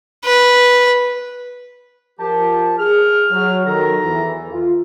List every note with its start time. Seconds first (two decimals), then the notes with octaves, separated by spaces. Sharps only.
0.25 B4
2.20 F3 G4 A#4 A5
2.79 G#4 F6
3.31 F#3
3.66 D#3 F#3 A4 A#5
4.04 E2 E3
4.52 F4